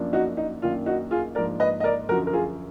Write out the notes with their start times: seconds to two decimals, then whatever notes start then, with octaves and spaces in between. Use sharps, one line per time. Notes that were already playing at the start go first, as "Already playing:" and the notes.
Already playing: F#2 F3 A#3 D4
0.13 D#4 F#4
0.37 D#4
0.62 F#2 D#3 A#3 D4 F4
0.86 D#4 F#4
1.11 F4 G#4
1.35 G#2 F3 A#3 D4 A#4 D5
1.60 B4 D#5
1.80 D#5
1.84 A#4 D5
2.09 F#2 D3 F3 F#4 A#4
2.27 A#4
2.33 F4 G#4